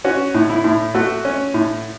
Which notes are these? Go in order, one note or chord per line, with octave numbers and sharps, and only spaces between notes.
C#4 F#4
A2
E4
A2
A3 F#4
C#4
A2